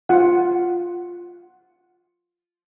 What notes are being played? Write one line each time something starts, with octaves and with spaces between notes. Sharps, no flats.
F4 F#5